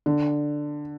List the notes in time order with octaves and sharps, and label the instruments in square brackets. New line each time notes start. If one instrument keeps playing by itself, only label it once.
[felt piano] D3